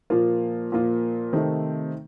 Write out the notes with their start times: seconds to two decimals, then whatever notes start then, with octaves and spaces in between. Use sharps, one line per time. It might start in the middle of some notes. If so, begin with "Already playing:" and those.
0.10 A#2 F3 A#3 F4
0.72 A#2 F3 A#3 F4
1.33 C3 D#3 A3 C4 D#4